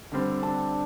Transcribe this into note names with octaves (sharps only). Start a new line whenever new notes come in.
D3 G3 C4
D4